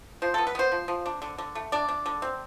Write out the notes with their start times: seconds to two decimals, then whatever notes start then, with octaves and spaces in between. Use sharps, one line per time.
0.22 F3 C5
0.34 B3 A4
0.47 B4
0.55 B3 C5
0.72 F3
0.88 F3
1.06 D4
1.22 D3
1.38 D3
1.55 A3
1.72 D4 D5
1.89 D4
2.06 D3
2.22 C4